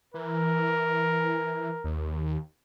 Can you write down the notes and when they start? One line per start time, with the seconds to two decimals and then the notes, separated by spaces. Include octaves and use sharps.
0.14 E3 A#4
1.84 D#2